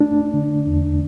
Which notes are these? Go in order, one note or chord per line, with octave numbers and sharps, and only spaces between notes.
A3 D4
D3
E2